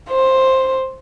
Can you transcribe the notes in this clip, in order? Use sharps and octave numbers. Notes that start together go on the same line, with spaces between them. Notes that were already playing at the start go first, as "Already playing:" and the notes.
C5